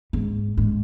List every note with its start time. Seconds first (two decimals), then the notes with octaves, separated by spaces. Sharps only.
0.13 G#2
0.58 G#2